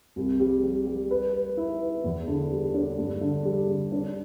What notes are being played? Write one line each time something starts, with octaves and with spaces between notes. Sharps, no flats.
C2
G3
G3
G3
B4
B4
E4
B4
E2
D3
G3
D4
G2
D3
G3
D3
D4